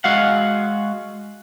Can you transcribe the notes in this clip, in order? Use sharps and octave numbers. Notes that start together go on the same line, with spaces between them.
G#3 F#4 F5 F#5